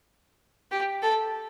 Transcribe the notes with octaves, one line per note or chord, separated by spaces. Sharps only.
G4
A4